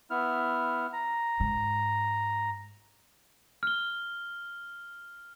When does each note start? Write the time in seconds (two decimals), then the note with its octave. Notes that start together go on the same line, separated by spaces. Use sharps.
0.10 B3 E4 F6
0.93 A#5
1.40 G#2
3.63 F6 G7